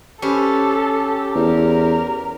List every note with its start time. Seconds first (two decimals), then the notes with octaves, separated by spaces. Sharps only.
0.22 C#4 G4 A4 B4 C5
1.35 E2 A#4